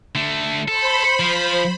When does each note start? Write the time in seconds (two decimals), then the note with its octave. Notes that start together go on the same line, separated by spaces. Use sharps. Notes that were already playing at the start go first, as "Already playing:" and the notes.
0.15 D3 A3
0.68 A4 C5 B5
1.20 F3